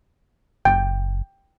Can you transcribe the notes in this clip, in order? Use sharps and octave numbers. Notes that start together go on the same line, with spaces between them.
F#1 G5